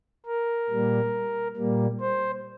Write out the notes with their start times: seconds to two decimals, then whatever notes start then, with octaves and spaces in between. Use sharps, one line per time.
0.26 A#4
0.70 A#2 G3 A#3
1.56 A#2 G3 A#3
2.00 C5